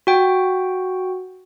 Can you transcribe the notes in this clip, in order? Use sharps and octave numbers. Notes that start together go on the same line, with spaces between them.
F#4 G5